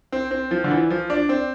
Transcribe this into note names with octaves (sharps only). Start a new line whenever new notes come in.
C4
C4
F3
D3
E3
F3
D4
C4